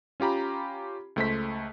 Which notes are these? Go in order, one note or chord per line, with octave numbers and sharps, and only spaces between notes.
C#4 F4 G4 A#5 B5
C#2 A3 C5 B6